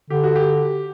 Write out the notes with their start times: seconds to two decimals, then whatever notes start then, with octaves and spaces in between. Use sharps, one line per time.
0.10 D3 G4
0.24 F#4
0.36 G4